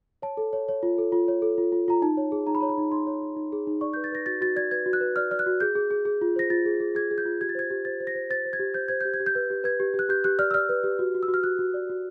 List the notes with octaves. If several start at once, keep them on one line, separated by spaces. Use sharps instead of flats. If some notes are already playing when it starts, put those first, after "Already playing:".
C#5 A5
A4
C#5
C#5
F4
A4
F4
C#5
A4
F4
F4
F4 A#5
D#4 A5
C#5
G#4
D#4 A#5
B5
C#5 A#5
B5
D#4
D#4 C6
C#5
D#4
D#4
G#4
D#4
D5 C#6
B4 G6
A6
B4 A#6
F#4 A6
F#4 A6
D5 G#6
B4 G#6
F#4
F#6
B4
D5 F6
D5 F6
F#6
F#4
G#4 G6
G#4
G#4
G#4
F4
C5 A#6
F4 A6
G#4
G#4
G#4 G#6
G#4
G6
F4
G4 G#6
A6
C5 G#6
G4
C5 A6
C5
A#6
C5
C5 A6
C5
G#6
G4
C5 G6
C5 G#6
G4 G6
G#6
G4
G6
B4
G4
B4 G#6
G4
G4
F#6
G4 G6
G4 F#6
D5 F6
E6
D5 F6
B4
G4
F#4
F#4
E6
F#4
F6
F#4 F#6
F#4
D5
F#4